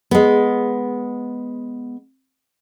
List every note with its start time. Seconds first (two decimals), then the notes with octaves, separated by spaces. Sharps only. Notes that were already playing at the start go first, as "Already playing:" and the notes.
0.11 G#3 B3